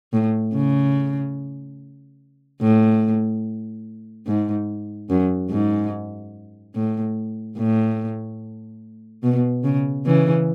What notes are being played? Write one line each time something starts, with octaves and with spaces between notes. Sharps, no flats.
A2
C#3
A2
G#2
F#2
G#2
A2
A2
B2
C#3
C#3 E3